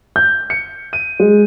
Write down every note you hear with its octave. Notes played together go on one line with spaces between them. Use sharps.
G6
C#7
D#7
G#3